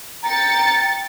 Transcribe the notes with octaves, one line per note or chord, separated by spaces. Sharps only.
G5 A#5 A6 C#7